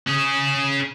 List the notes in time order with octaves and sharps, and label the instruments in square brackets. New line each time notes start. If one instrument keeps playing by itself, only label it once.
[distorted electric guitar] C#4 G#4